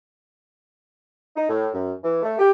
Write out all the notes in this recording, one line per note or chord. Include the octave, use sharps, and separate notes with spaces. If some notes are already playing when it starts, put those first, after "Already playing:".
D#4
A2
F#2
E3
A3
G4